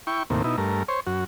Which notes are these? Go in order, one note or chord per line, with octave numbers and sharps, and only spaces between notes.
E4 G5 C#6
D#2 A2 C3 A#3
B2 D#4 E4
G2 A3 A#4
C5 C#5
F#2 F#4